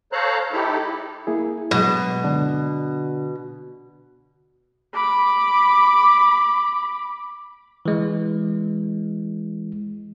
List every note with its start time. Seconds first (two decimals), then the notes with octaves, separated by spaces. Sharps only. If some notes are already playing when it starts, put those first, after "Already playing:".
0.12 A4 C5 C#5 F5 A#5 F#6
0.52 G#3 D#4 E4 G4 A4
1.27 A#3 E4 G#4
1.71 G2 B2 F#3 G#3
2.24 D3 B3 D4
4.95 B5 D6
7.86 E3 G#3